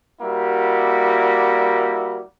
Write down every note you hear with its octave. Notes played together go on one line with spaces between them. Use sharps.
G3 A#3 E4 F#4